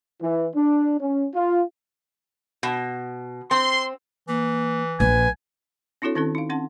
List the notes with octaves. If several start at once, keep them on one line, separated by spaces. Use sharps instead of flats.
E3
D4
C#4
F4
B2
C4 C6
E3 A#3
A#1 B4 G#5
C4 D4 E4 F#4 A4 C#5
D#3 C4 C#4 E4 A4
D#4 F5
C4 C#4 F#5 C6